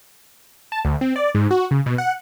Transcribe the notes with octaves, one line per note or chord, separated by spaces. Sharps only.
A5
D2
C4
D5
G#2
F#4
C#3
B2
F#5